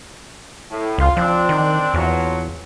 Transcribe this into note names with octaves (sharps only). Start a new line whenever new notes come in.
A2
C#2 F4
F3 C4 D4
D#3
E2 A#2 F3 F#3